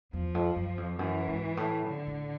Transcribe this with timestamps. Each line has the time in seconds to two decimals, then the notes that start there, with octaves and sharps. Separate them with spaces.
0.13 E2 F3
0.35 F2
0.56 F#2
0.78 F2
0.99 F#2 E3
1.28 G#2
1.57 A2
1.85 D3
2.07 A2